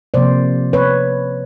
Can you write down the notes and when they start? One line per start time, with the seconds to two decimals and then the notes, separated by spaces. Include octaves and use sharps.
0.14 C3 F3 A#3 C5 D5
0.73 B4 C#5